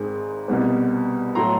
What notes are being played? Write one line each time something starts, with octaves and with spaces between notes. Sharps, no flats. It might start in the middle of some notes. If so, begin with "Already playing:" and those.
Already playing: G#1 G#2 D#3 G#3
C2 B2 G3 B3
A2 F#3 A3 A#5 C6